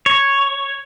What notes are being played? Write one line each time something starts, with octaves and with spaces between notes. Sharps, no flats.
C#5